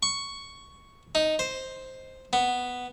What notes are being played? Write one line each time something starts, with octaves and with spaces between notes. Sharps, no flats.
C#6
D#4
C5
B3